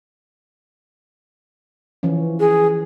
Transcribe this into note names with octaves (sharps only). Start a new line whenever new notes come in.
E3 F3 C#4
G#4